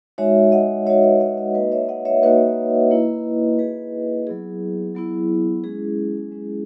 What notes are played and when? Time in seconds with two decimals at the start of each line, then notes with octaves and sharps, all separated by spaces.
0.18 G#3 D#4 F#4 C#5 E5
0.52 D#5 F#5
0.86 G#3 D#4 F#4 C#5 E5
1.03 B4 D#5
1.20 D#5 F#5
1.37 C#5 E5
1.54 A#3 D#4 F#4 B4 D#5
1.72 C#5 E5
1.89 D#5 F#5
2.05 C#5 E5
2.23 A#3 D#4 F#4 B4 D#5
2.91 A#3 E4
3.59 A#3 E4 G#4 B4
4.27 F#3 B3 E4 G#4
4.95 F#3 B3 E4
5.64 G#3 C#4 E4 G#4
6.31 G#3 C#4 E4